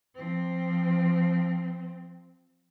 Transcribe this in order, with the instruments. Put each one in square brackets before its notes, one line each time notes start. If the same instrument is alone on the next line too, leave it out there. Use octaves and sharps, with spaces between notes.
[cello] F3 C4